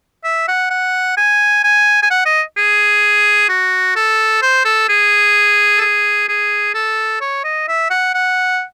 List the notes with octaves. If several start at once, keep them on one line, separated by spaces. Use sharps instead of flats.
E5
F#5
F#5
G#5
G#5
G#5
F#5
D#5
G#4
F#4
A4
C5
A4
G#4
A4
G#4
G#4
A4
C#5
D#5
E5
F#5
F#5